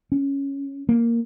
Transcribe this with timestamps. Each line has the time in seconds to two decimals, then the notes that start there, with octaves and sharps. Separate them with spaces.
0.12 C#4
0.89 A#3